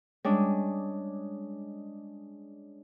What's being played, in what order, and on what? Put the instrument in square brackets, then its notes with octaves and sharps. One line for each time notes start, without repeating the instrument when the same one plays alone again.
[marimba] G3 [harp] G#3 C#4 D4